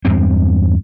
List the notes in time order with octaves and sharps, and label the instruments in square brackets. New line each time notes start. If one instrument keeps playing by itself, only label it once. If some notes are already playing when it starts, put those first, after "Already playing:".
[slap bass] E2 G2 G#3 C4